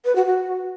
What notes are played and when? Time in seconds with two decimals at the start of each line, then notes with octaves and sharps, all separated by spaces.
0.05 B4
0.16 F#4
0.26 F#4